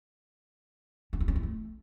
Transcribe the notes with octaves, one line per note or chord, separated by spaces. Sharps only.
C#4
E4
C#4
E4
A3